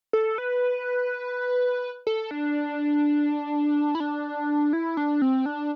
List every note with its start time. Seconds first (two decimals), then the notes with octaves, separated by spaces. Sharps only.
0.13 A4
0.38 B4
2.07 A4
2.31 D4
3.95 E4
4.00 D4
4.73 E4
4.97 D4
5.22 C4
5.46 D4